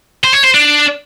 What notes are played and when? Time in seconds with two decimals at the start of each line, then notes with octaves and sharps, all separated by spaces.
0.24 C5
0.34 C#5
0.44 C5
0.54 D4